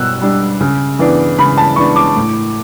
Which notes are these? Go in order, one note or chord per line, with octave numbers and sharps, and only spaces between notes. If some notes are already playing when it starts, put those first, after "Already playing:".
Already playing: B2 G3 E6 F#6
G3 D4
C#3
E3 B3 D4
C#3 B5
A5
E3 B3 D4 C#6
D6
A2